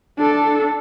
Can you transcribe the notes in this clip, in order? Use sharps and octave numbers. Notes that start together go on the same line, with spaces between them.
D4 A4